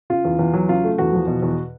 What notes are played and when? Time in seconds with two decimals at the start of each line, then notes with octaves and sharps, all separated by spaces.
0.10 C#3 F4
0.25 E2
0.39 E2
0.54 F#3
0.69 C#3 F4
0.84 A3
0.98 E2 F#4
1.13 F3
1.27 B2
1.42 E2